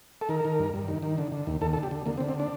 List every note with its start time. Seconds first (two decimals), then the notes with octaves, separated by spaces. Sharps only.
0.21 A4
0.29 D#3 A#4
0.45 D#3
0.59 G2
0.74 G2
0.88 D#3
1.02 D#3
1.18 D3
1.32 D3
1.47 D#2
1.61 D#2 A4
1.73 A4
1.77 D3
1.83 G4
1.91 D3
2.06 D3 A#3
2.17 C4
2.20 D3
2.29 C4
2.40 D4